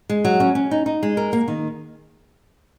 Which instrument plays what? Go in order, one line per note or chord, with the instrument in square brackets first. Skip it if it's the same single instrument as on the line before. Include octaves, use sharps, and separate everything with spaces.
[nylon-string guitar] G#3
F#3
C#4
C#4
D#4
D#4
G#3
A#4
A#3
D#3